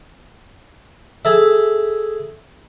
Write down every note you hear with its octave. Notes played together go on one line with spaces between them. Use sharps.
G#4 A4 E5